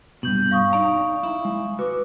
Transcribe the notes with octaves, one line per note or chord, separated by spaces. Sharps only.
G2 B2 G6 F#7
F5 C#6 D#6
D#4 D5 A#5
E4
G#3
F#4 B4 D6